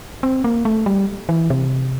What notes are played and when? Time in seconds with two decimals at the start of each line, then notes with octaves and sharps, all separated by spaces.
0.23 C4
0.44 A#3
0.65 A3
0.86 G3
1.29 E3
1.50 C3